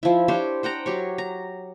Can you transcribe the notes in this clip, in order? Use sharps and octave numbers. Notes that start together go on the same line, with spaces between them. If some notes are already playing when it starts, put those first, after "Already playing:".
F3 E4
D4 G4 C5 C#5
C5 F#5 G5 A#5
F#3 G4 C#5
A#5